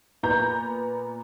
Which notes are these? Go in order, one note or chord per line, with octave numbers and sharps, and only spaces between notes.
A#2 B3 A#5 G6